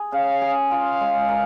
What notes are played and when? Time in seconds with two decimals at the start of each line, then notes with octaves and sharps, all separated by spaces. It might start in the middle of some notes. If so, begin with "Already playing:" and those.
Already playing: G#4
0.12 C#3 F5
0.41 G#4
0.71 F4 F5
1.01 G#3
1.29 A#4